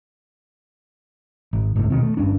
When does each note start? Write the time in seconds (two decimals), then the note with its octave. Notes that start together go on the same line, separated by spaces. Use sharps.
1.53 G#1
1.76 D1 G1 C#2 A2
1.90 E1 B2 D#3 C4
2.03 A3
2.17 G1 G2 C#4 D4